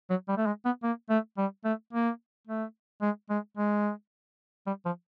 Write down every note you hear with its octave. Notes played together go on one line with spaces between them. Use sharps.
F#3
G3
A3
G#3
B3
A#3
A3
G3
A3
A#3
A3
G#3
G#3
G#3
G3
F3